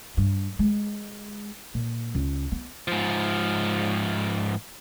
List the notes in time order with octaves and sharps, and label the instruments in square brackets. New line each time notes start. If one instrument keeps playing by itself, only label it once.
[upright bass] G2
G#3
A#2
C#2
B3
[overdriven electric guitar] G#2 F3